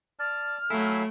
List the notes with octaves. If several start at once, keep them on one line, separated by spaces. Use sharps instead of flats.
D5 A5 F6
F#3 A3 E4 E5 F5 G#5